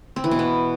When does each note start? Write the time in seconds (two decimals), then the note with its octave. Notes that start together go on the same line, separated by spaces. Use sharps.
0.16 C4
0.24 E3
0.31 B2
0.39 B3